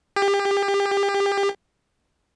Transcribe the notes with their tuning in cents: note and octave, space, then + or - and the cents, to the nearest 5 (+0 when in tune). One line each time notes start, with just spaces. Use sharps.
G4 +30